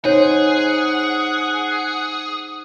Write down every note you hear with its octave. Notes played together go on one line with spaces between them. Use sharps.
D#4 G#4 C5 C#5 F#5